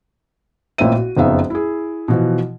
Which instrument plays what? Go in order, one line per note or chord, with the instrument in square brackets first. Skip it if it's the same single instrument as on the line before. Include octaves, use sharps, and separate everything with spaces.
[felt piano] A1 A#2 A#3 C4 E5 D#7
F#4
F#1 F2 B3 D#4 E5 F5
E4 G#4
B2 E3 F3